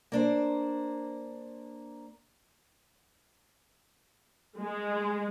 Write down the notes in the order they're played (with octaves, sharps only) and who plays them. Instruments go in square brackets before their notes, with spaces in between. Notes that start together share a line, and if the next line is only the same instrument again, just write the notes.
[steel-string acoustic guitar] A#3 D4 C5
[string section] G#3